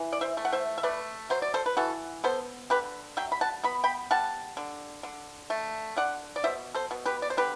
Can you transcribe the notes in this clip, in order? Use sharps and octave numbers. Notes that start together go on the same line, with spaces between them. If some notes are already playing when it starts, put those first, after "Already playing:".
Already playing: E3
D5
C5 E5
A3
F#5
C5 E5
E5
A3 B4 D5
F#3 C5
D5
A4 C5
B4
E3 F#4 A4
B3 A4 C5
D3 G4 B4
F#3 E5 G5
B5
F#5 A5
B3 B5
G5 B5
G3 F#5 A5
D3
D3
A3
D3 D5 F#5
D5
B2 C5 E5
A4 C5
B2
G4 B4
D5
C5
D3 G4 B4